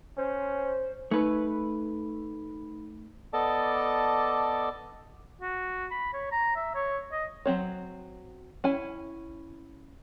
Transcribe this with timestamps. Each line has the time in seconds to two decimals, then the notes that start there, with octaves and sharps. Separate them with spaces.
0.18 C#4 C5
1.11 A3 D#4 B4 B5
3.33 B3 A4 D5 D#5 A5 D6
5.41 F#4
5.91 B5
6.13 C#5
6.32 A#5
6.56 E5
6.75 C#5
7.12 D#5
7.46 F#3 C4 C#5
8.64 C#4 E4 G#5